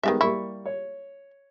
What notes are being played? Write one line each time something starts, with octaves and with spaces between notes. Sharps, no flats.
D#3 G3 G#3 B3 D4 E5
G3 A#3 E4 C#6
C#5